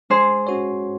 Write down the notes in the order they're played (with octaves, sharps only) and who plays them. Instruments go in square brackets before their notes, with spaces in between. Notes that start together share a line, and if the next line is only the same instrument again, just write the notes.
[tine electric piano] G#3 [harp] G#4 C5
[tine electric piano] C#4 F#4 C#5